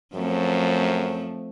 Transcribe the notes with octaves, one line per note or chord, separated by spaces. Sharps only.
F#2 F3 A3 C4